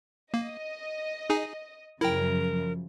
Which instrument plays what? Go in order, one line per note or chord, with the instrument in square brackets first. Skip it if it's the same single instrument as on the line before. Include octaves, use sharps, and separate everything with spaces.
[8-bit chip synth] A#3 [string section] D#5
[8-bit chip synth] D#4 G#4 G#5
[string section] F#2 C#3 F3 [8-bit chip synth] E4 G5 [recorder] A#4